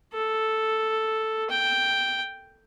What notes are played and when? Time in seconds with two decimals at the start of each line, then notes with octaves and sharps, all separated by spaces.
0.13 A4
1.50 G5